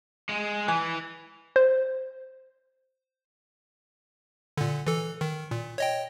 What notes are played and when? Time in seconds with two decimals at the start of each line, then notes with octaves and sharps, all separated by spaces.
0.29 G#3
0.68 E3 G#5 F#6
1.56 C5
4.57 A#2 D3
4.87 E3 A4
5.21 D#3
5.51 A#2
5.78 C#5 D#5 G5